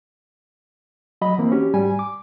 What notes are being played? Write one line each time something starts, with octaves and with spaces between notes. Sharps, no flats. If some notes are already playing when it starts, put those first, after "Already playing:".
F#3 D#5 B5
E3 A#3 C4
C#4 F#4 G4
G#2 G3 G#5
D6